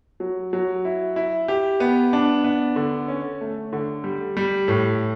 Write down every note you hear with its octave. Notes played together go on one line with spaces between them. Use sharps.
F#3
F#3
E4
E4
G4
B3
D4
B3
D3
C#4
A3
D3
G3
G3
A2